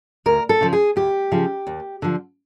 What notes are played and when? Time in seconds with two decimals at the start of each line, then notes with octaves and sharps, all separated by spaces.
0.26 D2 A#4
0.49 A4
0.61 C#3 F3
0.73 G#4
0.96 D2 G4
1.32 C#3 F3
1.67 D#2
2.02 D3 F3